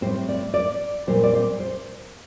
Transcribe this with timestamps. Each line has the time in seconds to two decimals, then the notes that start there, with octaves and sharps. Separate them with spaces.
0.01 A2 G3 C4 C5
0.29 D5
0.54 D5
1.07 A#2 G3 C4 C5
1.23 D5
1.34 C5
1.60 C5